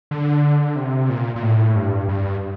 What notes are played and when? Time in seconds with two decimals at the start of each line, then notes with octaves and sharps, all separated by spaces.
0.11 D3
0.76 C3
1.10 A#2
1.36 A#2
1.42 A2
1.76 G2
2.09 G2